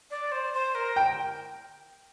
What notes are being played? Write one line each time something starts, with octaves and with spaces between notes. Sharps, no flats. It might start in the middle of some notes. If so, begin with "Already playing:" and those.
D5
C5
C5
A#4
G5